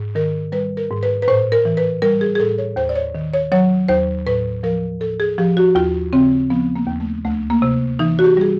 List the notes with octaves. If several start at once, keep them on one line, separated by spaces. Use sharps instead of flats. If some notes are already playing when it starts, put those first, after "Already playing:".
Already playing: G#2
D#3 A#4
G3 B4
A#4
G#2
B4
B4
A2 C5
A#4
E3
B4
G3 A#4
G#4
G#4
A2 A4
C#5
D#2 C5
D5
C#5
D#3
C#5
F#3 C#5
D#2 C5
A2 B4
F3 A#4
A2 A4
G#4
F3 G4
F#4
D#2 F4
C#3 C4
F3 B3
A#3
D#2
A3
D2 A3
A#3
C3
E3 D#4
F#4
G4
G3 G#4